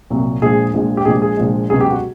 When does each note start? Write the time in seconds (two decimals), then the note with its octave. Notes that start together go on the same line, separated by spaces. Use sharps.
0.10 C2 A#2 F#3
0.42 A#1 A#2 F3 G#3 G#4
0.73 A#1 A#2 F3 G#3
0.97 G4
1.05 A#1 A#2 F3 G#3 G#4
1.22 G#4
1.37 A#1 A#2 F3 G#3
1.69 C#2 B2 F#3 G#4
1.81 G4
1.90 F#4